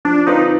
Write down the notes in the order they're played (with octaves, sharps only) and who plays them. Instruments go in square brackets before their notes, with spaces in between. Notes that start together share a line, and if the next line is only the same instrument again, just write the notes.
[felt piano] F3 [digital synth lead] D4
[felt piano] C4 F4 B4 D5 [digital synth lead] D#4